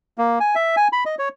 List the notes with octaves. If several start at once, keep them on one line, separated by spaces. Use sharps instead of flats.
A#3
G#5
E5
G#5
B5
D#5
C#5